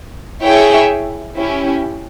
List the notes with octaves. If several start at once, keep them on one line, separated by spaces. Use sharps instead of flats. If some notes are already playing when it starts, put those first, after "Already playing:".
E4 G#4 C#5 E5 G5
C#4 E4 G4